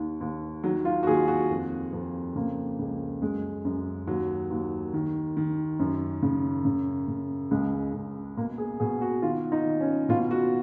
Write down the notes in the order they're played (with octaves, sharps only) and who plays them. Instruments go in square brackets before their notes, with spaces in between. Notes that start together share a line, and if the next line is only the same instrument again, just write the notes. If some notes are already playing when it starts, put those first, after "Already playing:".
Already playing: [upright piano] D#2 D#3
D#2
D#3 F#3
F4
F#4
D#2 G#4
F#4
F2
F2
C#3 A#3
C#2
F#2 G#3
F#2
D#2 F#3
D#2
D#3
D#3
F#2
C#3
C#3
C#3
C#2 G#3
C#2
B2 A#3
G#4
B2 G#4
F#4
D#3 F4
D#4
D#3
C#4
B2 F4
F#4